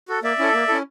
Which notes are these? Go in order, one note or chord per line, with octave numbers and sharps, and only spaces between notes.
F#4 A4
A#3 D5 E5
C#4 E4 A4
A#3
C#4 E4 A4